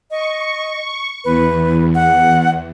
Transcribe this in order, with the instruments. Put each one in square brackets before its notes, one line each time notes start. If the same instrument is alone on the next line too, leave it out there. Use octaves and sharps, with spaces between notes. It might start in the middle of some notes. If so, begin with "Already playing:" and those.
[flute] D#5 [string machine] C#6
[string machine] E2 [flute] B4
[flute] F#5